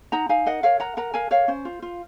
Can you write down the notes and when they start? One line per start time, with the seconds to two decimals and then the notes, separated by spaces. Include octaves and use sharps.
0.12 D#4 F#5 A#5
0.29 D#4 F5 G#5
0.46 A#4 D#5 F#5
0.63 A#4 C#5 F5
0.80 A#4 F#5 A#5
0.97 A#4 F#5 A#5
1.14 A#4 F5 G#5
1.31 A#4 C#5 F5
1.48 C#4 C5
1.65 F4
1.82 F4